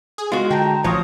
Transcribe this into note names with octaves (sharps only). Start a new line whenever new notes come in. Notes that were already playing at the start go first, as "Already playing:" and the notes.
G#4
G#3 F4 F#4
D3 D#5 G5 A5 A#5
A1 F3 F#4 C#5 D#6